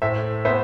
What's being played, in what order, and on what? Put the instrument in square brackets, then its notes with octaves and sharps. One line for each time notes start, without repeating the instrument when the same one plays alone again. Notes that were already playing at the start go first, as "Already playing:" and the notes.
[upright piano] A2 C5 E5
B3 C5 E5